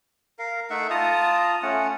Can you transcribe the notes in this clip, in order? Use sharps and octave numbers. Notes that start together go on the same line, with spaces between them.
A#4 F5
A3 D#4 E5 F#5
F4 A5 A#5 D#6
A3 C#4 F#5